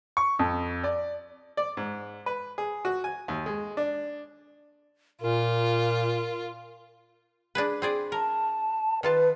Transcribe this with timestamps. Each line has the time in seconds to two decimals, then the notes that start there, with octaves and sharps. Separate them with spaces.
0.17 C#6
0.39 F2
0.84 D5
1.57 D5
1.77 G#2
2.26 B4
2.58 G#4
2.85 F#4
3.04 G#5
3.28 D#2
3.46 G#3
3.77 D4
5.22 A#2 F4 A#4
7.55 D4 G#4 B4
7.82 C4 G#4 D5
8.12 A#4 A5
9.03 D#3 F4 B4 A5